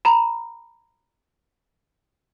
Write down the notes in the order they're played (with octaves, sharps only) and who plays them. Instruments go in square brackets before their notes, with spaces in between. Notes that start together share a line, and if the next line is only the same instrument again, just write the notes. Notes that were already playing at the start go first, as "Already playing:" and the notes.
[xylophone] A#5 B5